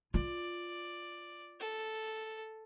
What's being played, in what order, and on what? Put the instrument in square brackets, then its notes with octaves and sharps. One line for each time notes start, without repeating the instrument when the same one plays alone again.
[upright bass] F4 [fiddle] D5
[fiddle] A4